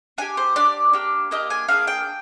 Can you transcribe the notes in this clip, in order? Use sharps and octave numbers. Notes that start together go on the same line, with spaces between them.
D4 G4 G#5
C5
D4 G4 D5
A#3 D4 G4
A#3 D4 G4 D#5
G#5
A#3 D4 G#4 F5
G5